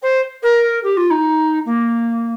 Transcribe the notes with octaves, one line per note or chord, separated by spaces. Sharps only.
C5
A#4
G4
F4
D#4
A#3